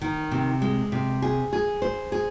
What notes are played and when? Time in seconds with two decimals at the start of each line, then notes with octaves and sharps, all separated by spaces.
0.01 D#3
0.32 C3
0.62 G#3
0.92 C3
1.22 G#4
1.53 G#4
1.82 C5
2.12 G#4